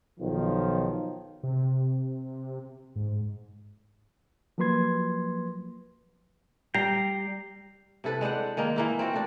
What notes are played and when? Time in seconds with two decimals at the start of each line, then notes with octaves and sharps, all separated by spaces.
0.20 B1 D#3 F3
1.43 C3
2.96 G#2
4.58 F3 F#3 A#3 B4 C6 G#6
6.75 G3 G5 A#5 C7
8.04 C3 E4 A4 B4
8.21 G#3 D4 C5 F#5
8.57 D#3 G#3 A#3
8.76 E3 A#3 E4
8.99 C4 F4 F#4
9.13 A3 D4